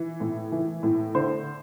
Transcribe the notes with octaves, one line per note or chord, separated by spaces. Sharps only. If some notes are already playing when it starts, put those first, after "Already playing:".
Already playing: E3
A2
E3
A2
D3 C5